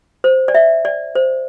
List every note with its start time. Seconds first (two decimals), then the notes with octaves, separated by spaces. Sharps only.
0.24 C5
0.48 D5
0.55 E5
0.85 D5
1.15 C5